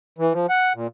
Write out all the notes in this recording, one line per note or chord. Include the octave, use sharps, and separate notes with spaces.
E3
F3
F#5
A#2